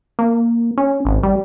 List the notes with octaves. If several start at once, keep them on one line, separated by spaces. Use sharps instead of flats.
A#3
C#4
G#1
G3